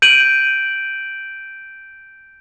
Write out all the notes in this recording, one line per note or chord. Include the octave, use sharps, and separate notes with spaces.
G6 D7 D#7 F#7